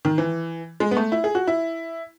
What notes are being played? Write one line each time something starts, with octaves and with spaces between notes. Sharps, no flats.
D#3
E3
G#3
B3
A3
E4
G#4
F#4
E4